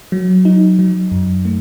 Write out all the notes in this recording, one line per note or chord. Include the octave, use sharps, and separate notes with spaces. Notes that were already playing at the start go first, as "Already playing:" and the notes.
F#3
D#4
F#3
F#2
A3